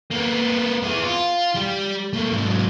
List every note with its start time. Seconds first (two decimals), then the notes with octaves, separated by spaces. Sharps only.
0.11 A#3 B3
0.83 B3 G#4
1.03 F4
1.55 G3 G4
2.13 A3 A#3
2.31 G#2 F#3